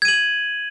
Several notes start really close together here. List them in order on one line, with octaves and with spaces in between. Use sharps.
G#6 D#7 F#7